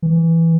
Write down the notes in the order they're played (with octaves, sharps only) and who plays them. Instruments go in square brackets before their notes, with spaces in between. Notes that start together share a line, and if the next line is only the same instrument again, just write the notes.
[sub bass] E3